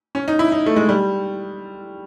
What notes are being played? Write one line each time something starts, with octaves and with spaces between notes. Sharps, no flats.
C#4
D#4
E4
D#4
A3
G#3
G3